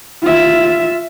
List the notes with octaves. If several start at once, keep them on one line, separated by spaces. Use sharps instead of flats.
F4 E5